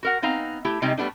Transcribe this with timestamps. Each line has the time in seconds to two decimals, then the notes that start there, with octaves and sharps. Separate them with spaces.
0.03 F#4 A#4 F#5
0.22 B3 C4 D#4 F5 A#5
0.65 A3 E4 G4
0.82 C3 G3 G#3 C4 D#4 G4
0.97 G3 A3 B3 D4 D#4